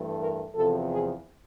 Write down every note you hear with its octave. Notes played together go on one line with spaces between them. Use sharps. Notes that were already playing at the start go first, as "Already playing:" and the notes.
Already playing: G2 E3 A3
A#4
E2 C3 F3 A4
G#4